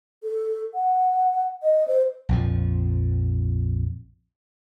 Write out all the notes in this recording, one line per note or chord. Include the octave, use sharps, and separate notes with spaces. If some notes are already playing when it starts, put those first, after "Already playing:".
A4
F#5
D#5
C5
A#1 F2 F3